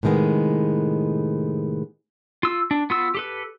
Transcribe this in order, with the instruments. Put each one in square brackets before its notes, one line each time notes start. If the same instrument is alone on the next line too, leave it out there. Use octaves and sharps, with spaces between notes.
[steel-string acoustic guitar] A2 C3 D#3 G#3 B3
[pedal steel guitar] F4 E6
D4
B3 F4 E6
G4 A4 B4